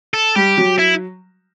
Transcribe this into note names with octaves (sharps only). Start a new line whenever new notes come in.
A4
G3 G4
F#3
E4